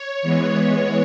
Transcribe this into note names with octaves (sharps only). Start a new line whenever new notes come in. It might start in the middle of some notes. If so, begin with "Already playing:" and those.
Already playing: C#5
E3 G#3 B3